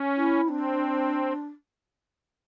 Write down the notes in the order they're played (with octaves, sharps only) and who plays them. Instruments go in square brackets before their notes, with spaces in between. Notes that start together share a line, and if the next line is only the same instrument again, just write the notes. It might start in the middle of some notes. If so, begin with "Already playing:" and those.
Already playing: [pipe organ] C#4
[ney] E4
[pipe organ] C4 [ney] D4